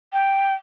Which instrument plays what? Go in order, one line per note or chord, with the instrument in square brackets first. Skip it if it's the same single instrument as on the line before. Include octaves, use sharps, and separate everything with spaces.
[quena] G5